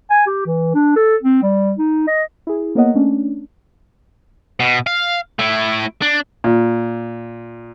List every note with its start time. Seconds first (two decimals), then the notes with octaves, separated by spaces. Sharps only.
0.10 G#5
0.27 G4
0.46 E3
0.74 D4
0.96 A4
1.23 C4
1.43 G3
1.79 D#4
2.07 D#5
2.47 E4 G#4
2.75 A#3 B3 A#4 C#5 D#5 F#5
2.95 A3 C#4 D4
4.60 B2
4.87 F5
5.39 A3 E4
6.02 D4
6.44 A#2